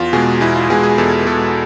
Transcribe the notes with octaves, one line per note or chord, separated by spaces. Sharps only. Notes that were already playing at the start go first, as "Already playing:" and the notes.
Already playing: E2 F4
B2 G#3 G#4
E2 E4
F4
B2 G#3 G#4
G#4
E2 A4
B2 G#3 A4